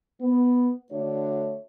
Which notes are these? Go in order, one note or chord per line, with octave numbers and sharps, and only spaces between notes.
B3
D3 A3 D4 F#4 C#5